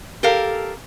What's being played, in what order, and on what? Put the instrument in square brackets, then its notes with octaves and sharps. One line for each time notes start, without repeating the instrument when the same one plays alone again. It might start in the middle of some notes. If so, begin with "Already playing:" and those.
[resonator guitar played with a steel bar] G4 A4 A#4 F5